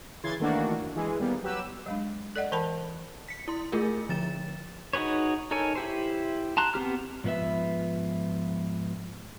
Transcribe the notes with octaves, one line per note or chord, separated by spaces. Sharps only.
C#3 E3 C6 G#6 A6
D#3 E3 A3 A#3 D4 F#4
F#2
E3 G#3 G#4
D#2 G3 A#3 B3
F#3 G4 B4 E6
F#3 G#3 D4
A4 D5 D#5 F#5
E3 A#4 G5 A5 B5
B6 C#7
E4 C6
A3 F4 G#4 A#4
D3 F3 A6 E7
D#4 F#4 G#4 B4 C#5
D#4 A4 A#4 C#5 G#5
E4 G4 C5
A5 A#5 C6 F#6
B3 C4 G4 F6
G#2 F3 B3 B4 E5